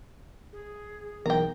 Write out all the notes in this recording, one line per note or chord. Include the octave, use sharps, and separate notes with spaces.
G#4
B1 E3 F#3 A#4 G5 A#5